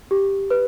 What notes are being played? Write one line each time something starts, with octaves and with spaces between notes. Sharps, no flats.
G4
B4